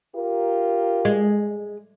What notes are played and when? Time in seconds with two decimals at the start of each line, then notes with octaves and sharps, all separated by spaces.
0.16 F4 G4 A#4
1.05 G#3